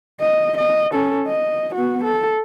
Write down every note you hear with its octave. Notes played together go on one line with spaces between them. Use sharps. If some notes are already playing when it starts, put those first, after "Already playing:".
D#5
D#5
C#4 A4
D#5
B3 F#4
A4